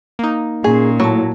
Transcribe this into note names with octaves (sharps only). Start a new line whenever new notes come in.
A#3 D#4
A#2 C#4 G#4
A2 F#3 E4 A5